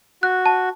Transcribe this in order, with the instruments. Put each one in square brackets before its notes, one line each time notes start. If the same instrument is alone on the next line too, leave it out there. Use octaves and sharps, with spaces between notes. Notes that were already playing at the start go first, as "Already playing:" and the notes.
[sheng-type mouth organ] F#4 [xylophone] F#6
[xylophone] A5